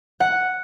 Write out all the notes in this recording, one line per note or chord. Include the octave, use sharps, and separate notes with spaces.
F#5